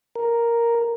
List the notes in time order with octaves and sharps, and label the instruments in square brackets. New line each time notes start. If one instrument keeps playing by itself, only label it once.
[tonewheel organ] A#4